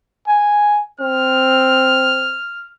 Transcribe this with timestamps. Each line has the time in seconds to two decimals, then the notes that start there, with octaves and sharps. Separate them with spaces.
0.27 G#5
1.00 C4 F6